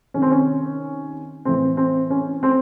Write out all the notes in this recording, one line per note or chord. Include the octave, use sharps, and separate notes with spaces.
C3 D#3 C#4
C4
C#4
A2 E3 C4
C4
C#4
C4